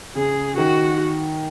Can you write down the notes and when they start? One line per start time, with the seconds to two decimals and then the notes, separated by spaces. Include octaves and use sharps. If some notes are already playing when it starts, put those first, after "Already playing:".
0.15 C#3 G#4
0.57 D#3 F#4